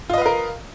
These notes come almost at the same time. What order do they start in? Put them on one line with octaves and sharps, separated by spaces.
F4 D#5 B4 F5 A#4